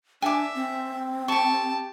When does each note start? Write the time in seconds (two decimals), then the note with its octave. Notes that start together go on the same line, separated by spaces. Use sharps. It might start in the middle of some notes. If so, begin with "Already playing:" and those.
0.22 D4 E5 G#5 D6
0.55 C4
1.28 G4 A5 C#6